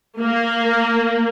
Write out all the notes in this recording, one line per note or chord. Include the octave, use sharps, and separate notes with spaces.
A#3